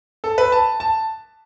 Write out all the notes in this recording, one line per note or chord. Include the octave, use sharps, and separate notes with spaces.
A4
B4
A5
A5